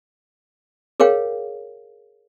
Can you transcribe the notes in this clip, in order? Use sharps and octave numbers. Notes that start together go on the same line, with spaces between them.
G#4 A#4 C#5 F5 G5